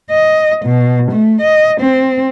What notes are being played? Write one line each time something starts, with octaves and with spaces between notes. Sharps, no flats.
D#5
B2
A3
D#5
C4